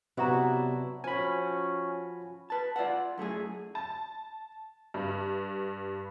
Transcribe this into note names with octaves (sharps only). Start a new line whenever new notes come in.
C3 F#3 B3 D4 E4 F#4 C5 A#5
F3 C#4 F#4 G#5 B5
B4 A5
F4 D5 E5 F#5
F#2 A3 E4 G#4
A5
G2